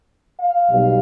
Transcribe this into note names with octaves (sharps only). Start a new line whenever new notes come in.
F5
B1 B2 G3